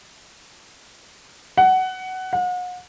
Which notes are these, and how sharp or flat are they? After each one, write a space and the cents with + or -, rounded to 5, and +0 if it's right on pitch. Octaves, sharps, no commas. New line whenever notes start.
F#5 +15
F#5 -40